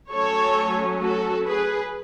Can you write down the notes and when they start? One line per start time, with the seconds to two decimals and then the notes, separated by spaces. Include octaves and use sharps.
0.12 F#3 A3 C#4 A4 C#5
1.03 F#4 A4
1.48 G#4 B4